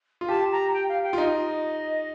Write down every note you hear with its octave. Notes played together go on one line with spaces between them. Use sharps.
F4
G4 A5
A#5
G5
F5
G5
F4
D#4 D#5